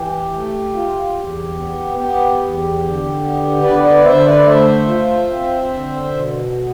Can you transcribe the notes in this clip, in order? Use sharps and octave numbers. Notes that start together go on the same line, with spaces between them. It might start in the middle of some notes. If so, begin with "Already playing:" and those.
Already playing: E3 G4
A3
F4
E2
B3
B3 G4
E2
D3
B3
D3 B4 D5
B4 D5
D3 C5 E5
B4 D5
A3 C5 E5
F4
C4
D3
B2
B3